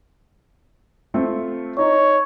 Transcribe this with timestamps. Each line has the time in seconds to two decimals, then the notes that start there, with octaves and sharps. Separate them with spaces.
1.14 A3 C4 F4
1.78 D#4 C#5 A#5